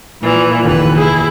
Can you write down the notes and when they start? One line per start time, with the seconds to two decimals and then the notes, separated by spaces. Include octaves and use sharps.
0.21 A#2 E3 F3
0.63 F1 D#2 E3 B4
0.97 E4 G#4